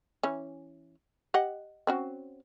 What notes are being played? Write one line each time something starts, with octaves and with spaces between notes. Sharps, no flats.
E3 C#4
G4 D#5 F#5
C4 C#4 F#4